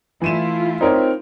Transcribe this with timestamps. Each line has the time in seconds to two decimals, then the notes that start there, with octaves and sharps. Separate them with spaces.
0.22 E3 A3 E4 F4 D#7 E7
0.81 C4 D#4 A#4 C#5